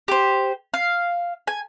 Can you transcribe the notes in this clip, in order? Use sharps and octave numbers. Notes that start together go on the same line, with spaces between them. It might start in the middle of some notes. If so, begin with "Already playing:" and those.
G4 C5
F5
G#5